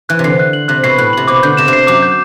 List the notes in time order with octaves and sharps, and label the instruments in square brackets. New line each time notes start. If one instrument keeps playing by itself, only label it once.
[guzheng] E3 [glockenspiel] F#6
[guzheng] C3
[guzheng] D3 [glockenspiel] C7
[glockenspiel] F#6
F#7
[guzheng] C3 [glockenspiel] F#6
[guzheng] B2 [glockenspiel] C7
[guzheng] A2 [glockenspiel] F#6
[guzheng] C3 [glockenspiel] F#7
[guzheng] B2 [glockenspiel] D6
[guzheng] D3 [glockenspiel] G6
[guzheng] C3 [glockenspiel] E7
[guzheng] C3
[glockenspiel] C7
[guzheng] F#2 [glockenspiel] D6
[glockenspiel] G6